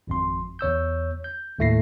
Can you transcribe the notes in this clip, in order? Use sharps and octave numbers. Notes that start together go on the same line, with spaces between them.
G#1 F2 C6
E2 C#5 E6 G6
G6
D#2 A2 A3 E4 A#6 C7